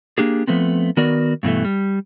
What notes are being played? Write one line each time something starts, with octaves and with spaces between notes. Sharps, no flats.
A#3 D4 G4 G#4
F3 A3 B3 C4
D#3 B3 F#4 A#4 D5
G2 B2 E3 A3
G3